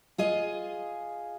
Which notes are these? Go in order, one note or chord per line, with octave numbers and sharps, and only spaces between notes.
F4 G#4 D#5